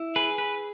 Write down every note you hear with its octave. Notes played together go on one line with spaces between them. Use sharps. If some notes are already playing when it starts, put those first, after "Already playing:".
Already playing: E4
G#4 B4
B4